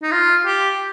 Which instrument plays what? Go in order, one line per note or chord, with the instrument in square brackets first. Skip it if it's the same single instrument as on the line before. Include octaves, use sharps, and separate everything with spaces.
[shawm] D#4
F4
G4